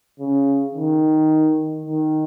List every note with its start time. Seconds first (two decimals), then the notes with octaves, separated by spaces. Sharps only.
0.20 C#3
0.75 D#3
1.86 D#3